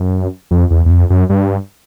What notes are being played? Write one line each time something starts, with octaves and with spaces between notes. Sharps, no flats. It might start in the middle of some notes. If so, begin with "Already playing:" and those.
Already playing: F#2
F2
E2
E2
F2
F#2
G2